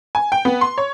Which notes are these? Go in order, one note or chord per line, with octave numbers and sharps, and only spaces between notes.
G#5
G5
B3
C6
C#5